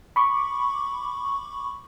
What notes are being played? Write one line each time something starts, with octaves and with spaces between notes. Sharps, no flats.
B5 C#6 D6